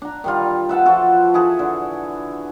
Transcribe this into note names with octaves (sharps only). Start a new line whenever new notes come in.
D4 A#5
D#3 G3 F4
B4 E5 F#5 A5
F3 F4 F#4 A4
E4 G#4 A4 B4
D3